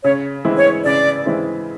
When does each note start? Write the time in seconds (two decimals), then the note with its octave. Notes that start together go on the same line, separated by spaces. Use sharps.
0.04 C#3 C#5
0.45 E3 G#3 C4 E4
0.58 C#5
0.85 C#3 D5
1.26 E3 G#3 C4 E4